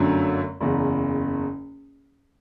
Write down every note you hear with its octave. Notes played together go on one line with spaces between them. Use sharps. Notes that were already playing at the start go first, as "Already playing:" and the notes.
Already playing: G1 F#2 D3 F#3 A3
F#1 E2 C#3